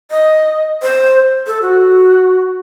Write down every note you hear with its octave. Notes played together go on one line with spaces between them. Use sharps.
D#5
C5
A4
F#4